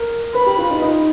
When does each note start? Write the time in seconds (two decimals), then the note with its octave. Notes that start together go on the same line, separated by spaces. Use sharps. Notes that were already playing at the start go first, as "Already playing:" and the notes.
Already playing: A#4
0.35 B4 B5
0.47 G4
0.59 F4
0.71 D#4
0.82 D#4